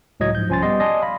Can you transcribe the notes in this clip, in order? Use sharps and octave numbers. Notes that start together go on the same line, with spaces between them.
C#2 A2 F#3 D#5 G#6
G#2 F3 G6
C2 F3 C#4 G#5 C6 A6
G3 B3 G4 D#5 C6
D5 D#5 G#5 A5 C6
F5 B5